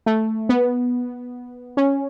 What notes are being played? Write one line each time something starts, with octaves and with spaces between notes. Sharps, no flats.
A3
B3
C#4